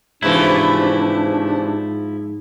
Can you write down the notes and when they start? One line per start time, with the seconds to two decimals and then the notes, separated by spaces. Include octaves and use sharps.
0.22 G#2 C3 E3 F3 A3 D4 E4